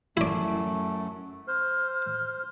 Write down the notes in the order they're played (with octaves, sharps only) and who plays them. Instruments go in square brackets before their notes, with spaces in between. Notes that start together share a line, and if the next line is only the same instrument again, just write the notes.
[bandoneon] F#2 A3 [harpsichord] E4 D5
[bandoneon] C5 [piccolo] F6